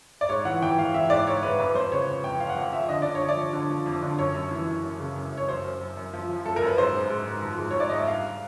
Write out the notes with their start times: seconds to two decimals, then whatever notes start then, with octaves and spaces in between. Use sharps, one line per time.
0.21 D5
0.29 G#2 C#5
0.45 E3 F#5
0.62 E3 G5
0.79 E3 F5
0.94 E3 E5
1.10 G#2 D5
1.27 G#2 C#5
1.43 G#2 B4
1.59 F2 B4
1.75 F2 C5
1.92 C#3 C#5
2.07 F2
2.24 F2 G5
2.40 F3 F5
2.49 F#5
2.56 F2 F5
2.72 F3 E5
2.89 D3 D#5
3.02 D3 D5
3.15 C#5
3.21 F3
3.29 D5
3.37 F3
3.53 D3
3.70 F3
3.86 F2
4.02 D3
4.18 F#2 C#5
4.35 F#2
4.51 E3
4.67 F#2
4.83 F#2
5.00 C#3
5.16 F#2
5.31 F#2
5.37 C#5
5.48 F#2 C5
5.65 F#2
5.81 F#2
5.97 F#2
6.13 F3
6.29 F3
6.45 F#2 A4
6.56 A#4
6.62 F#2
6.67 B4
6.78 G#2 C5
6.94 G#2
7.10 G#2
7.26 G#2
7.42 F3
7.58 G#2
7.71 C#5
7.75 G#2 D5
7.89 G#2 D#5
7.98 E5
8.07 G2 F5